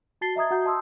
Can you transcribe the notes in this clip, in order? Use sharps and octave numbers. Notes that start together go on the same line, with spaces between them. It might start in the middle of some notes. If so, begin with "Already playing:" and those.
F#4 A5 A6 C7 G7
D#5 E5 A#5 D#6 G#6
F#4 F#5 A#5 D#6 G6
D#5 A5 C6 D#6 E6